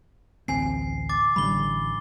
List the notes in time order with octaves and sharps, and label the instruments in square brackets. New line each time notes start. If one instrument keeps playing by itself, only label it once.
[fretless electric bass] A1 D2 C4 [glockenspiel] G#5 C7
[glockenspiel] D6 A6
[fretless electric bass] A1 D3 G3 [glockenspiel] B5 G7